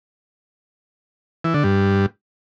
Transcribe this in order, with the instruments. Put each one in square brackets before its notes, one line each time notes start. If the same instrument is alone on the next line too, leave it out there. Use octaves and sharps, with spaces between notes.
[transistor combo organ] E3
D3
G2